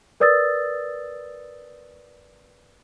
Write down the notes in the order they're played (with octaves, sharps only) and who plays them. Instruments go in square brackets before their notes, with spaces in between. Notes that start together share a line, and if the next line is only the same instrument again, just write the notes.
[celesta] A#4 B4 D5 D#6 E6 A6